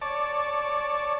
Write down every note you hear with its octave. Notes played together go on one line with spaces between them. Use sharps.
C#5 D5 A5